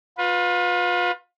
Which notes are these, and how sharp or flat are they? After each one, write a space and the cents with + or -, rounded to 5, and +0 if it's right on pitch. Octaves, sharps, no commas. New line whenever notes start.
F4 +30 B4 +0